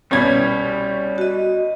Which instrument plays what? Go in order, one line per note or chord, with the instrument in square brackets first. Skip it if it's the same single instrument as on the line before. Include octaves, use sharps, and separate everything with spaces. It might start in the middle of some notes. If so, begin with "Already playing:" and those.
[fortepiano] C2 B2 [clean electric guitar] G3 [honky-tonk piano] C#4 G#6
[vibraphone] F#4 D#5